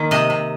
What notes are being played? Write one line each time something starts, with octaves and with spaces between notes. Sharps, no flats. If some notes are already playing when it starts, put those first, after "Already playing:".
Already playing: D#3 A#3
C3 D#5
C3